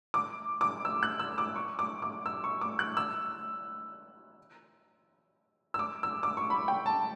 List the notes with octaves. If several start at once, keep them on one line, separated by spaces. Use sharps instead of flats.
D6
D6
E6
F#6
E6
D6
C#6
D6
D6
E6
C#6
D6
F#6
E6
E6
D6
E6
D6
C#6
B5
G5
A5